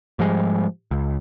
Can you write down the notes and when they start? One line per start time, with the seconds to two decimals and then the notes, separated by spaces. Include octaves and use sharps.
0.19 G#2 F3 G3 G#3
0.91 C#2